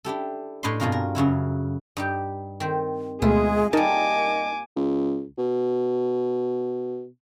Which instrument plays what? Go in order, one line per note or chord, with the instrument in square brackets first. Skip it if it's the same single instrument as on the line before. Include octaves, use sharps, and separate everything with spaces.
[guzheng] D4 E4 G4 A4
A2 D4 B4 D#5 B5 C6
G2 B2 C4 F4 G#4 A#4
A#4
F#2 C#3 F#3 E4
G2 D#4 G4
D#3 C4
[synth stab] D2 B2 A3 [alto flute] G#3 [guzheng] E4 F4 [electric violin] G#4
[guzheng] G3 A#3 [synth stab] D#4 A#4 A5 [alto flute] D#5 [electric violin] G#5 D6
[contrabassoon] C#2
B2